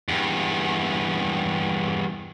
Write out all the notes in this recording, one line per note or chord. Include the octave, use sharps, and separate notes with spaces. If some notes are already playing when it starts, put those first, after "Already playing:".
E2 G2